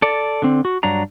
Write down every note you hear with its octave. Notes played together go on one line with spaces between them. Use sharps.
A4 D5
D3 C4
F#4
G2 F#3 D4 A#5